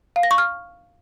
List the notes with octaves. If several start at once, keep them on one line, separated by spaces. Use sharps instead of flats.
F5
A#6
C#6
F6